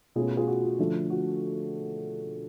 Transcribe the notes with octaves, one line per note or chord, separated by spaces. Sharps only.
B2 A3 C#4 F4 G#4
F#4
F4 G#4
F#4
F4
D3 F3 A3
F#4